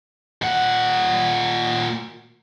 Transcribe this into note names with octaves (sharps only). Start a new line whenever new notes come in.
A#2 F#5